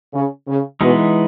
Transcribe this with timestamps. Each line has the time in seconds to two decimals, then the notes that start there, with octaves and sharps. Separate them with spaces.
0.14 C#3
0.48 C#3
0.81 B2 E3 G#3 B3 D#4